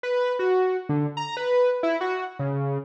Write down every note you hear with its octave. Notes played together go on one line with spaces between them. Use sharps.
B4
F#4
D3
A#5
B4
E4
F#4
C#3